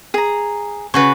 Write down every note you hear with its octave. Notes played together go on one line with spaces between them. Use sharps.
G#4 A#5
C#3 F#4 B4 C#6